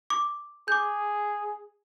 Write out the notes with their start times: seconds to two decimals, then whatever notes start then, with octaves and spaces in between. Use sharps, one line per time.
0.10 D6
0.68 G#4 D6 G6